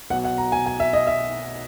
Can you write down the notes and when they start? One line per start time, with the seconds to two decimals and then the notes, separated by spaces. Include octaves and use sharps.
0.10 B1 B2 F#5
0.24 F#5
0.38 A#5
0.52 G#5
0.66 G#5
0.80 E5
0.93 D#5
1.07 E5